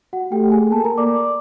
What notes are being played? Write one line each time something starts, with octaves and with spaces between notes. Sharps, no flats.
F#4 F#5
A3 G4 G5
G#4 G#5
A#3 A4 A5
A#4 A#5
D5 D6